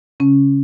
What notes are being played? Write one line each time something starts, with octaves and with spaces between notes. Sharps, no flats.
C#3 C#4